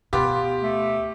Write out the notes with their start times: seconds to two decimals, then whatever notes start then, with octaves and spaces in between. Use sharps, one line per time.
0.13 D1 B2 B3 F4 G4 D6
0.63 A3